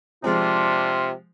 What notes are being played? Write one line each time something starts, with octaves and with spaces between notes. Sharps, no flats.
C3 F3 G#3 C4 D4 F4